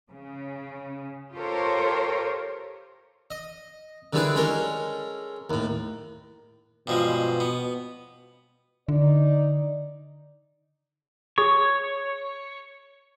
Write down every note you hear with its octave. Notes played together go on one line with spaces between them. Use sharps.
C#3
F4 G4 A4 A#4 C5 C#5
D#5
D3 D#3 G3 E4 G#4 B4
G#3 C#4 A4 A#4
D#2 A2
G2 B2 F3 G#3
B3
D3 D#4 D5
G#4 C#5 C#6